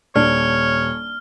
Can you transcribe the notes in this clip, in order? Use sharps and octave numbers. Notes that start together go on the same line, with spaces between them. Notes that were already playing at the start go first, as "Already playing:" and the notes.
D#1 D4 C#5 F6